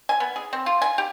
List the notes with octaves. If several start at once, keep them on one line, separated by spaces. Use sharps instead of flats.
G#5
B3
G#4
C4
F4
G#5
G4